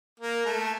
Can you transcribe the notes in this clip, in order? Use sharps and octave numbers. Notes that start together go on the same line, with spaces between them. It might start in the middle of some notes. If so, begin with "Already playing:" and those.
A#3
A3